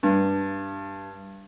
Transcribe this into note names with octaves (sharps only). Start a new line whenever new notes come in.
G2